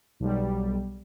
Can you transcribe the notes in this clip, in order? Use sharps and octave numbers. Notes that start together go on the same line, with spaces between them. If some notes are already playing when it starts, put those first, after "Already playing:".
B1 G3